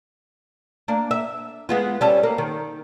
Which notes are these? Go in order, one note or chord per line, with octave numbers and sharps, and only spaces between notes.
A#3 D4
E5
G#3 B3 F4
G3 C#4 A4
A#3
D#3